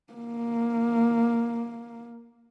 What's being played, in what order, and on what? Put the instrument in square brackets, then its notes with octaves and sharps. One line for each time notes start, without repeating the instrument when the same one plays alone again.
[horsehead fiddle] A#3